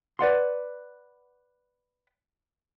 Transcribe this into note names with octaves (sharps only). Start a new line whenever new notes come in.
B4 D5 F#5 C6